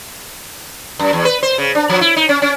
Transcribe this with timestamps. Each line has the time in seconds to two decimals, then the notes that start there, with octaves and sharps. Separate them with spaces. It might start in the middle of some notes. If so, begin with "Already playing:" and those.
0.99 F#2
1.13 E2
1.25 B4
1.43 C5
1.58 C#3
1.75 D4
1.89 F3
2.01 E4
2.16 D#4
2.29 C#4
2.42 C#4